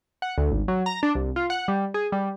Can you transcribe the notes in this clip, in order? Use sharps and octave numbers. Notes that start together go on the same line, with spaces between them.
F#5
D2
G#1
F#3
A#5
D4
C2
F4
F#5
G3
G#4
G3